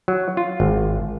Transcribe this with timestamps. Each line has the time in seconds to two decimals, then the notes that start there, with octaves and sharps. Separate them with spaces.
0.08 F#3
0.37 F4
0.60 G#1